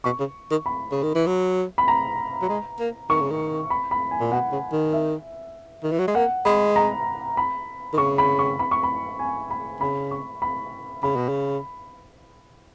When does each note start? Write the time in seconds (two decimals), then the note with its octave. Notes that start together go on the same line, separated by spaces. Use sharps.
0.04 B2 C#6
0.19 C#3
0.51 D#3
0.66 B5
0.91 C#3
1.03 D#3
1.15 E3
1.27 F#3
1.78 B5
1.88 A#5
2.42 F#3
2.49 G#3
2.80 A#3
3.10 D#3 C#6
3.20 C#3
3.30 D#3
3.70 B5
3.91 B5
4.11 G#5
4.20 A#2
4.32 B2 F#5
4.52 C#3
4.72 D#3
4.93 E5
5.83 D#3
5.91 E3
5.99 F#3
6.08 G#3
6.15 A#3 F#5
6.45 G#3 B5
6.76 A#5
7.37 B5
7.93 D#3
7.98 C#3 C#6
8.18 B5
8.39 C#6
8.59 B5
8.71 C#6
8.83 B5
9.19 G#5
9.51 B5
9.81 C#3 B5
10.11 C#6
10.42 B5
11.03 C#3 B5
11.16 B2
11.29 C#3